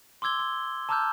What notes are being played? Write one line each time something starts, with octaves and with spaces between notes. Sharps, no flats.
C6 D6 E6 G#6 G7
C6
A5 A#5 D6 E6 F6 G6